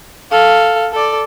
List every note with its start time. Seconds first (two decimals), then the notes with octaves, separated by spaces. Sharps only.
0.31 A4 F5
0.92 A4 D5